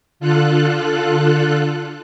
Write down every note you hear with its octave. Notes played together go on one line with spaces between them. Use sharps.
D3 F4 A4 F#6